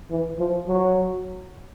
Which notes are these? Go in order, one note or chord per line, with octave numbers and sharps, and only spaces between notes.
E3
F3
F#3